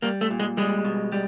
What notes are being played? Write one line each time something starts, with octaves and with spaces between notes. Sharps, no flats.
G3 A#3
A3
A#2
G#3
G3 G#3
B2
G3